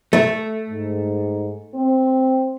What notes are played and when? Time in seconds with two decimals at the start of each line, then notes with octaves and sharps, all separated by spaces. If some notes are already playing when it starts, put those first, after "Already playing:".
0.13 A3
0.70 G#2
1.74 C4